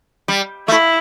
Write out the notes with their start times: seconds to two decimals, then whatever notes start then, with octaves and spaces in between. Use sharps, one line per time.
0.28 G3
0.68 A3 E4